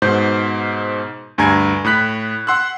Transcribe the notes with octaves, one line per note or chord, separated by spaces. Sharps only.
G#2 B2 C5 G6
D2 G2 G#5 A#5 G#6
A2 B5 F#6 B6
F#5 C6 E6 F#6